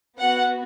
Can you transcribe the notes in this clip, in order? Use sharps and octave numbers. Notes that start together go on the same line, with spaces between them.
B3 F#4 F#5